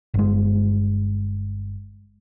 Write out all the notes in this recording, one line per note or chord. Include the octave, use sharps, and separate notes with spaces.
G1 G#3